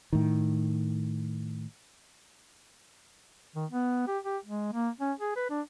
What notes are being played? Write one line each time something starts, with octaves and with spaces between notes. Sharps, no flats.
A2 D#3
D#3
B3
G4
G4
G#3
A#3
C#4
G#4
B4
D4